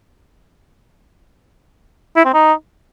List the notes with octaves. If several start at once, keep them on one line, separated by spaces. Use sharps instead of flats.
E4
C4
D#4